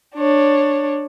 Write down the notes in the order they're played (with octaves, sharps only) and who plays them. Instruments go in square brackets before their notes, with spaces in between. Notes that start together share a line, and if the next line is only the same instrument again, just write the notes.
[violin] D4 C#5